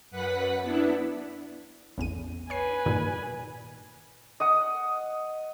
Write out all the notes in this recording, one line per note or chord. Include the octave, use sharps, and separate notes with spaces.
F#2 B4 F#5 B6
B3 D4 E4
A1 E2 D#7
B4 C#5 G#5 C7
G2 A#2 D#3
D#5 F#5 D#6